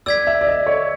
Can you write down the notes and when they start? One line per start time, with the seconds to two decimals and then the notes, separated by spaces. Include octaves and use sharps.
0.06 D5 E6 G#6 B6
0.27 E5
0.41 D5
0.47 D#5
0.67 C#5